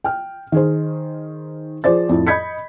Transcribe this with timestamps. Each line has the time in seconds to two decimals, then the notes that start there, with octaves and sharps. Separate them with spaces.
0.04 G5 F6
0.52 D#3 G#4 C5
1.84 F3 G#4 C5 D5 A6
2.09 F2 A2
2.27 D#5 B5 G6 G#6 B6 C#7